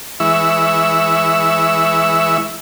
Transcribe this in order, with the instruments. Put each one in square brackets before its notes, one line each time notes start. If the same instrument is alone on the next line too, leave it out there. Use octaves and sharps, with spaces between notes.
[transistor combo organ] E3 G#3 E4 E5 C#6 E6